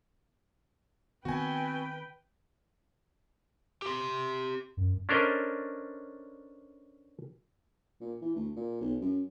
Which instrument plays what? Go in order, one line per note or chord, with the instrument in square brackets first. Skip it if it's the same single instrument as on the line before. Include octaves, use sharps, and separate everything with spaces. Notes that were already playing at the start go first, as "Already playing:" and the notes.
[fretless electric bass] D#3 B3 [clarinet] C4 [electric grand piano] F#4 G#5 [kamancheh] B4 G5
[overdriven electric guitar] G4 C6
[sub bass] F#2
[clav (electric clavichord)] C#4 D4 A4 A#4 C5 D#5
[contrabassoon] A#2
E3
D2
A#2
B1
F#2